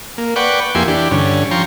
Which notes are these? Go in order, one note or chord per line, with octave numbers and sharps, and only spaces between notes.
A#3
B4 D5 F#5 G5 C#6
F2 A#3 E4 G4 G#5 C6
E3 D4 G4
G2 D3 C#4
F3 G5 A#5 C6 C#6